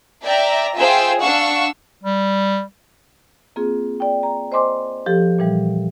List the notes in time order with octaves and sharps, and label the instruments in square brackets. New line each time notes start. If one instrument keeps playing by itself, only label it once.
[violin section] D5 E5 G5 A#5
F4 G#4 C5 E5 G5 E6
D4 F5 F#5 C#6 E6
[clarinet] G3
[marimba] A#3 C4 F4 G#4
D5 G5
A#5
C5 D#5 G#5 C6 D6
F3 G4 A4
A#2 E3 G3